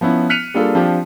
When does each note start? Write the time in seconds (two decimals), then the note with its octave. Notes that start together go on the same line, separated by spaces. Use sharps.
0.01 F3 B3 C#4 E4
0.30 F6 F#6 B6 C#7 D#7 F7
0.54 G3 A#3 D4 F4 G#4 A4
0.75 F3 C4 D4 F4 G4